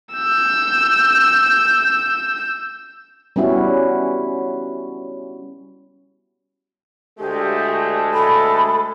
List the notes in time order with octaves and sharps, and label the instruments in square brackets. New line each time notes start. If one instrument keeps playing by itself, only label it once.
[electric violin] E6 G6
[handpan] G3 B3 C#4 E4 F#4
[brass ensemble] D2 G#3 A3 [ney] G4
[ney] A4 [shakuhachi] B5